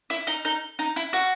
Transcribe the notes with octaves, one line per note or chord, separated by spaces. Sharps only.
E4
D#4
D#4
D#4
E4
F#4